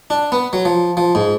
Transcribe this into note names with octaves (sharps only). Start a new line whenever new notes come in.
D4
B3
F#3
F3
F3
G#2